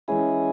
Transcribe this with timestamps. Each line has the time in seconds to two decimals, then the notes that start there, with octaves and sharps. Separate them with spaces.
0.08 E3 G#3 C#4 E4 G#4